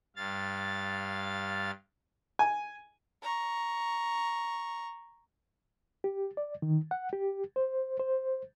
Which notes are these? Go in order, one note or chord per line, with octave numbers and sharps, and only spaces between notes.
G2 F5 A6
G#5
A#5 C#6
G4
D5
D#3
F#5
G4
C5
C5